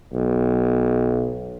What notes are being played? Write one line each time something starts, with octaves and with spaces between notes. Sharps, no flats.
B1